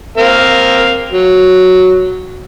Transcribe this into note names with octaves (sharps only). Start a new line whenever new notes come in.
C4 A#4 F5
F#3